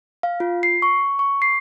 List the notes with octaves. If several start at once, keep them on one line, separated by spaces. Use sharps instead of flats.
F5
F4
C7
C#6
C#6
C7